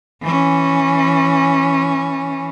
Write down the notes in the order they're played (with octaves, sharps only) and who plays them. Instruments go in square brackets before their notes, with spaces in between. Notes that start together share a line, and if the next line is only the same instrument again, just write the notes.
[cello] E3 C#4